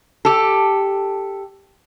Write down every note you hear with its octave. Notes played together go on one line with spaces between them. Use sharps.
G4 A4